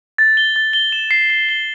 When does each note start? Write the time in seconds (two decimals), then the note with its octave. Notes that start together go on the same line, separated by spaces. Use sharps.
0.18 A6
0.37 G7
0.56 A6
0.73 G7
0.92 E7
1.11 C7
1.30 C7
1.49 G7